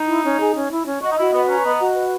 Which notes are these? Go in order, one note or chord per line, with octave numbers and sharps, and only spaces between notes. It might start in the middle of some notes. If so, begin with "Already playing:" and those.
Already playing: D#4
E4
C#4
G#4
C#4
E4
C#4
F#4 D#5
D#4
E4 F#4
B3 B4
C#4 A#5
B3 D#5
F#4
B4